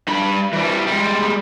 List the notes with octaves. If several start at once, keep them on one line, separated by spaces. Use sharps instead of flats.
G2 B5
E3 G3
G3 G#3